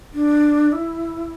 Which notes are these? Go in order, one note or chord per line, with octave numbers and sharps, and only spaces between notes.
D4
E4